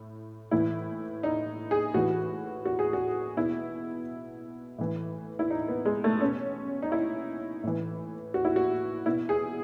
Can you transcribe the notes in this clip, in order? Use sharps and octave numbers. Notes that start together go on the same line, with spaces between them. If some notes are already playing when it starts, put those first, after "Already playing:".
Already playing: A2
A2 E3 E4
D#4
G#4
A2 E3 F#4
F#4
G#4
F#4
B2 E4
A2 E3
E4
D#4
B3
G#3
A3
B2 C#4
D#4
E4
A2 E3
F#4
E4
F#4
B2 E4
G#4